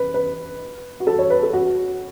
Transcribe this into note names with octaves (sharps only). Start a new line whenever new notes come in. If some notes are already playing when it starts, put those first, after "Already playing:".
Already playing: B4
B4
F#4
A4
C#5
B4
A4
F#4